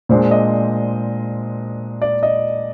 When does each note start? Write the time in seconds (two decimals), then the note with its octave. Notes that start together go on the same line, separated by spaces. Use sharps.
0.09 A#2 G#3 D4 C5
0.31 D#5
2.02 D5
2.23 D#5